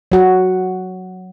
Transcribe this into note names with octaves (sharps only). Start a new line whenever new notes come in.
F#3 F#4